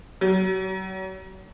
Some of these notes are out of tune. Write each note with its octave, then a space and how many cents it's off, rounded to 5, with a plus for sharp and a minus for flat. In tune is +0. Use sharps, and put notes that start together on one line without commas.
F#3 +40